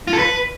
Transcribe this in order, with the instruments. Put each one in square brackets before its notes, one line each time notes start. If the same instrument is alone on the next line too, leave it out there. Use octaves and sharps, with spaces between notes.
[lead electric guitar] F4
A4
B4